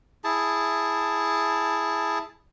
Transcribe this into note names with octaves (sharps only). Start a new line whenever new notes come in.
E4 G#4 A5